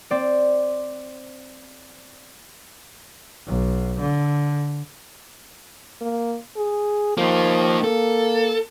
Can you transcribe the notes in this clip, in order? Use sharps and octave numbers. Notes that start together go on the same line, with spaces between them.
C4 D5
B1
D3
A#3
G#4
F3 A#3 D#4
A#3 A4